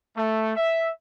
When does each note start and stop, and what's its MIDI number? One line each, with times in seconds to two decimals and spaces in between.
0.16 0.56 57
0.56 0.88 76